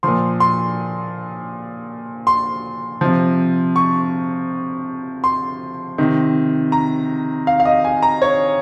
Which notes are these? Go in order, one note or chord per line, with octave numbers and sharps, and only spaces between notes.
A#2 F3 C6
C6
C6
C3 F3
C#6
C6
C3 D#3
A#5
F5
F5
D#5
G#5
A#5
C#5